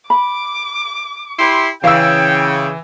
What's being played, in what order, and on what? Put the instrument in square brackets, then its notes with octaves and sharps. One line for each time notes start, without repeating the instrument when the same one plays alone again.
[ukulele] B5 [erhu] D6
[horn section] E4 G4 C6
[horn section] C#3 [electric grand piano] E3 E6 [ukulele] E5 F5 [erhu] G5